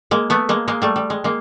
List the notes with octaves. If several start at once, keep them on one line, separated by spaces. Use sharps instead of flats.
G#3 A#3
A3 B3
G#3 A#3
G#3 A#3
G3 A3
G3
G#3
G#3 A#3